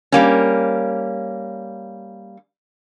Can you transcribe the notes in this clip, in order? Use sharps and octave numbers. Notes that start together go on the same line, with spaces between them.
G3 A#3 C#4